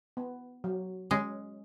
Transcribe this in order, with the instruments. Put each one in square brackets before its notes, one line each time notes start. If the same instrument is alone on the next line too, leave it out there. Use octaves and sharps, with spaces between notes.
[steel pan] B3
F#3
[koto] G#3 [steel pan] C#4